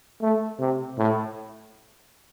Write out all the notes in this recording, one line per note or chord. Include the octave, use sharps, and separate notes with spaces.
A3
C3
A2